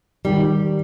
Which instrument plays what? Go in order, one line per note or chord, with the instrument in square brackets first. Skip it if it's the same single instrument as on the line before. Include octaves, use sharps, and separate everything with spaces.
[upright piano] D#3 [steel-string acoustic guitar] G3